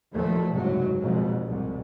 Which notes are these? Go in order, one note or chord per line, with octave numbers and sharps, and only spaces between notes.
D#2 A#2 F3 F#3 A3
F#1 C2 G#2 F#3
F1 A#1 F2 G#2 B2
C2 G#2